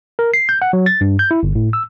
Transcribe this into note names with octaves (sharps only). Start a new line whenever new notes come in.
A#4
C7
G6
F#5
F#3
A6
G2
G6
E4
G1
A2
E6